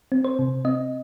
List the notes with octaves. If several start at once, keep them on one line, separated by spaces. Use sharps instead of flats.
C4
C5
C3
C4 D#5